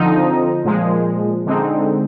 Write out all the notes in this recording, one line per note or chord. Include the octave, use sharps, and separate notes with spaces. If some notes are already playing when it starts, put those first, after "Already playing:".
Already playing: D3 F3 C4 D#4
A#2 F3 G#3
D3 G#3 C4 D#4